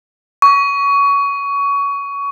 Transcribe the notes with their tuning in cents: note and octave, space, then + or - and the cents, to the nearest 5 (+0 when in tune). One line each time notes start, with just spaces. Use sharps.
C#6 +25